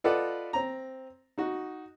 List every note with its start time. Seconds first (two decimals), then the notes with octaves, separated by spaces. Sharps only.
0.04 F4 A4 B4 D5 D#5 F#5
0.53 C4 A#5
1.38 D#4 F#4